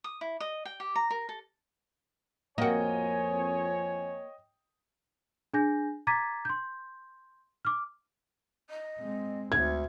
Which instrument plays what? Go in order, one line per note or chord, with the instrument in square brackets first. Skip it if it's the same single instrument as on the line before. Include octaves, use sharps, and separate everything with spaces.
[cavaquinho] D#6
E4
D#5
G5
G4
A#5
A#4
A4
[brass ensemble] F2 C4 G#5 [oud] A#3 F#4 [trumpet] C#5 [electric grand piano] D#5 G5
[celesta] D4 G#4 G#5 G6 A#6
A#5 D6 G#6 A6 B6 D#7
C6 G6
D6 F6
[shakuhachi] D#5
[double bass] G#3 C4
[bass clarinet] D2 [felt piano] G#6